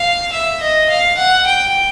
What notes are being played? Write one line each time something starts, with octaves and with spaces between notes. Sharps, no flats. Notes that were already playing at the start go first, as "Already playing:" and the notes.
Already playing: F5
E5
D#5
F5
F#5
G5